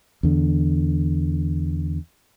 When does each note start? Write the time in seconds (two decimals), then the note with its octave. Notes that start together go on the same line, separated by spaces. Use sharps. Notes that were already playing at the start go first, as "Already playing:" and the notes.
0.23 E2 D3